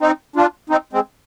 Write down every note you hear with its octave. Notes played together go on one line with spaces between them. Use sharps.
C4 D#4
D4 F4
C4 D#4
G#3 C4